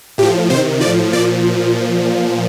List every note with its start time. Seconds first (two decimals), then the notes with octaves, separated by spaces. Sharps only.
0.18 A2 F3 G4
0.50 C3 D#3 C5
0.81 A2 F3 D5
1.12 A#2 F3 D5